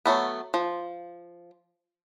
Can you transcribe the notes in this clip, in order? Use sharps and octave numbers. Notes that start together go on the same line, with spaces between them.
F#3 A3 B3
F3